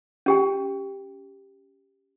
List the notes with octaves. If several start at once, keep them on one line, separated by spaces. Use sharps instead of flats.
C#4 G4 G5